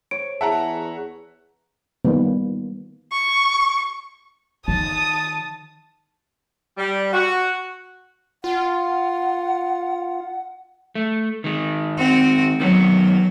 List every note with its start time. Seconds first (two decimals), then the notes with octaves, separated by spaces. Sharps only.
0.11 C#5 D7
0.41 E2 G#4 E5 F#5 A5 A#5
2.05 D#3 G3 A#3 B3
3.12 C#6
4.68 D#3 A5 D#6
6.77 G3
7.13 F#4
8.44 F4 F#5
10.95 A3
11.44 D#3 G#3
11.98 C4 F#4
12.60 D#3 F#3 B3